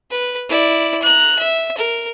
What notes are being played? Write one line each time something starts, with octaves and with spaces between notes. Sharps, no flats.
B4
E4 D5
A#5 F#6
E5
A#4